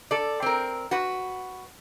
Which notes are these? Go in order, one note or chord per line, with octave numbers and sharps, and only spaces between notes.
A4 D5
C4 A#4
F#4 B4